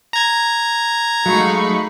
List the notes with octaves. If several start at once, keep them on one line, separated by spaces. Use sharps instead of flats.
A#5 G#6
F#3 G#3 A3 D#4 F5 B5 C#6